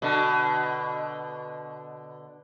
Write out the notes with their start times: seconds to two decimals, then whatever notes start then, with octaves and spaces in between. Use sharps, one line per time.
0.02 B2 D3